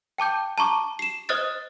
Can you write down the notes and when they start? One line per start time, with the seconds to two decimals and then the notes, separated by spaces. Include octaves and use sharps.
0.18 G5 A5 D6 G6
0.58 A5 A#5 C#6 D6
0.99 C7 E7
1.29 C5 D#5 D#6 F6 F#6 A6